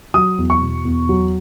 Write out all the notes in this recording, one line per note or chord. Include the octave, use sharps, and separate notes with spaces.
F#3 D#6
E2
C#6
B2
E2
F#3